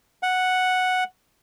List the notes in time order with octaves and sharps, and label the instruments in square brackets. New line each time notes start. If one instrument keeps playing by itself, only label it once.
[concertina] F#5